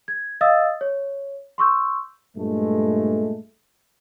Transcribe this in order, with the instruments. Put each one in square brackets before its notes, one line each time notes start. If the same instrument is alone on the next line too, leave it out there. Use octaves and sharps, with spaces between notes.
[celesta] G#6
D#5 F5 D#6 E6 A6
C#5
C6 C#6 E6 G6
[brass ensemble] G2 A#2 G#3 A3